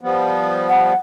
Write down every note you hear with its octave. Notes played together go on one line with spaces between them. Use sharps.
F3 G3 B3
F#5